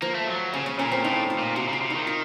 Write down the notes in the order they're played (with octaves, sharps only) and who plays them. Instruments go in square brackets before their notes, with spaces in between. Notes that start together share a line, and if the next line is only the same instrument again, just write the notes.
[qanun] F3 [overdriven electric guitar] A#3
[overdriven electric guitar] A3
F#3
[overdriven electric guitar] C#3 [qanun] C#4
[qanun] C#4
[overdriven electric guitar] A#2 [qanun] C#4
[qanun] C4
[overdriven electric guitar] A2 [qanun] D#4
[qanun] F4
[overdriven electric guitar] A#2
[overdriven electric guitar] C3 [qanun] F#4
[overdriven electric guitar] C#3 [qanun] F4
[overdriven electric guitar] C3
[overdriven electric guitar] D#3 [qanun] D#4
[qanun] F4